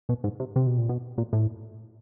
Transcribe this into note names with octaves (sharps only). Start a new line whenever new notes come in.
B2
G#2
C3
C3
B2
A#2
B2
A#2
A2